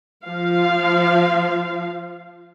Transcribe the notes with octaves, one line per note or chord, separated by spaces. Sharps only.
F3 F5